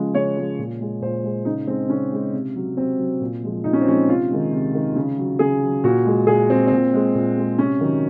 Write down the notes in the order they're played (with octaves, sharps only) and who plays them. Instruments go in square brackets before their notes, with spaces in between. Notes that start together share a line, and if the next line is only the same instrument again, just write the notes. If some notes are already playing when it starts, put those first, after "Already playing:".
Already playing: [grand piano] C#3 F3 G#3
C#3 C#5
F3 G#3
A#2
G#3
A#2 C5
G#3
C#3 D#4
G#3 C4
C#3 C#4
G#3
C3
F#3
C3 C4
F#3
A#2
F3 G#3
A#2 D#4
C#4
C4
F3 C#4
G#3
C3 F4
D#3 G#3
C3
D#3 G#3
C#3
F#3
C#3 G#4
F#3
A#2 F#4
G#3
A#2 G#4
G#3 C4
A#2 C4
G#3
A#2
G#3
C3 C#4
D#3 F#3